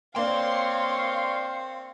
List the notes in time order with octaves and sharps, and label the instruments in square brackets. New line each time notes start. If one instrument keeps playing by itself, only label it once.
[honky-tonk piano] A#3 D4 [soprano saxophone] C4 [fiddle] C#5 F5 [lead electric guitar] C6